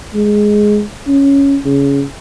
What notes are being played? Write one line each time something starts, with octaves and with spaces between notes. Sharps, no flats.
G#3
C#4
C#3